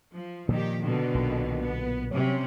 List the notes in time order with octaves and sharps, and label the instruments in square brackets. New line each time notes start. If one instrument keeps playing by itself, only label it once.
[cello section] F3
[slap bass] A#2 F3 G3 [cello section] D#3 G4
[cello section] B2 D3 D#3
[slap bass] B1 A#2
[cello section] B3
[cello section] C3 G3 C#4 [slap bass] F#3